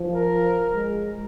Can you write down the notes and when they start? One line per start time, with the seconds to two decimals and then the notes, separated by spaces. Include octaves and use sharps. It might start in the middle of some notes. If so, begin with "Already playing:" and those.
Already playing: F3
0.12 A#4
0.74 G#3